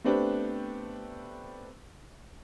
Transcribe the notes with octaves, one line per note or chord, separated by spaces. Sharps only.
A3 B3 C4 D4 G4 B4